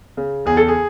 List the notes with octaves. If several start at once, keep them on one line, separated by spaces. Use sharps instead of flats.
C#3
E2 G#4
A4
G#4